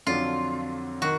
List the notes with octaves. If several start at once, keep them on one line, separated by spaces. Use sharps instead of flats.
F2 D3 F#3 D4 F4
D#3 F#4